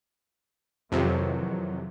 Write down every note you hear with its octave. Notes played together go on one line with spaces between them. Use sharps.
F2 C3 D#3 E3 F#3